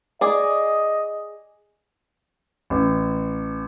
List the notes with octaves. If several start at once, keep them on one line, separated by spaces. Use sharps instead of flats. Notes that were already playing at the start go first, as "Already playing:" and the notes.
G#4 D5 D#5
A1